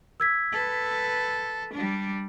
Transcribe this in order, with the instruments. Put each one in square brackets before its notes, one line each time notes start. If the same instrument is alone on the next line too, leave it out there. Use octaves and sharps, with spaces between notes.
[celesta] E6 G#6 B6
[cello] A4 B4
G3 D4